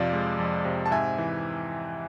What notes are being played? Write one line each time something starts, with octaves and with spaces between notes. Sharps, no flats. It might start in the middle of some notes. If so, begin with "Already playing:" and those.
Already playing: F2 C3 F3 D5 F5
G#3
F2
C3
A5
G#2 E5 G#5
E3